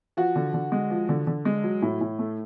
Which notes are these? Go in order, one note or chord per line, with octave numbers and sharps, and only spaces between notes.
F3 F#4
D3
D3
G#3
F3
D3
D3
G#3
F#3
A2
A2
A3